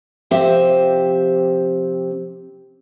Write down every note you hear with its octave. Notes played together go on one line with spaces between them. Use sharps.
C3 F3 C4 G4 C5 E5